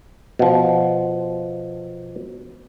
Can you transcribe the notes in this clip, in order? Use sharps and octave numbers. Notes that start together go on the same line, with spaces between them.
B2 F3